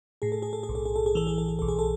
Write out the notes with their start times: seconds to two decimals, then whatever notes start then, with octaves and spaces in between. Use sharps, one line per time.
0.22 A2 G#4
0.32 A4
0.42 G#4
0.53 A4
0.63 G#4
0.69 B1
0.75 A4
0.85 G#4
0.96 A4
1.06 G#4
1.15 E3 A4
1.27 G#4
1.38 A4
1.48 G#4
1.59 B1 A4
1.68 G#4
1.79 A4